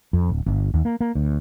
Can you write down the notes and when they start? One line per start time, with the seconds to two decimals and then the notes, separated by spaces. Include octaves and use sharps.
0.13 F2
0.30 D1
0.46 G1
0.74 D#2
0.85 A#3
1.00 A#3
1.15 D2